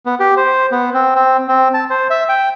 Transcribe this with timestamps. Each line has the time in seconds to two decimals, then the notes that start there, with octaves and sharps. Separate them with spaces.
0.06 B3
0.20 G4
0.37 C5
0.72 B3
0.94 C4
1.15 C4
1.48 C4
1.74 A5
1.90 C5
2.10 E5
2.29 G5